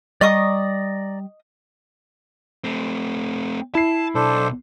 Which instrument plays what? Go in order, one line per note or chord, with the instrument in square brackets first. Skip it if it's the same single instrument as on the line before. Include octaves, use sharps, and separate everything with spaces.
[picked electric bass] G3 [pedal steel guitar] D5 A#5 [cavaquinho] D#5 C#6 D#6
[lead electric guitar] A3 C4
[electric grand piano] E4 C7 [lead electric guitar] A5
[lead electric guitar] B1 [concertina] D4 A4 C5